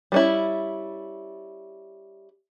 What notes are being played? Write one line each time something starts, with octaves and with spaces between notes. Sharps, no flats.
G3 C#4 E4